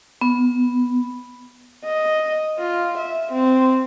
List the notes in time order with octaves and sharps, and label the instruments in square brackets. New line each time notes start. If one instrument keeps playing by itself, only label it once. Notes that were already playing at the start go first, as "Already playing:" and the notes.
[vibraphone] B3
[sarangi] D#5
F4
E5
C4